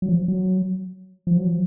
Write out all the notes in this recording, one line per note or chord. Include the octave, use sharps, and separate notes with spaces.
F#3
F3
F#3
F3
F#3
F3